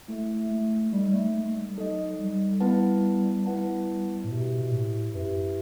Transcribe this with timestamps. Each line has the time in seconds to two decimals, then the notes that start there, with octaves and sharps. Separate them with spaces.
0.08 A3 E4 A4 E5
0.50 A3
0.92 G3 D#4 A4 D#5
1.13 A3
1.34 A3
1.46 A3
1.56 G3
1.77 F#3 D#4 A4 D#5
2.19 G3
2.60 B3 E4 B4 F#5 A5
3.46 B3 E4 B4 F#5 A5
4.24 A2
4.29 B2 E4 G4 B4 E5
4.61 B2
4.72 A2
5.14 F#2 E4 G4 B4 E5